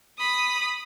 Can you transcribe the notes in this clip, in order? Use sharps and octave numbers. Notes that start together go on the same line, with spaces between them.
B5 D#6